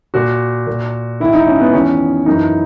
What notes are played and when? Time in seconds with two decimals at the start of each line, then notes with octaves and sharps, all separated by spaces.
0.14 A#2 F#4
0.67 A#2
1.20 G#2 D#3 E4
1.33 D#4
1.48 C#4
1.61 B3
1.73 E2 D#3 C#4
2.26 F#2 E3 D#4